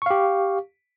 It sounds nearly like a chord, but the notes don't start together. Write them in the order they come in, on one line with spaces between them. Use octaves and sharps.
C#6 F5 G4